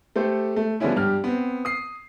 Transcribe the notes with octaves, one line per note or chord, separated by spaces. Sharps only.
A3 G4 A4 C5
A3
D3 F3 G3 B3 C#4 E4
G2 G4 F6
B3 C4
D#6 C7